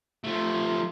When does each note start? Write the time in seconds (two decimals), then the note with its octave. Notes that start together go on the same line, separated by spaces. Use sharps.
0.24 F3 A3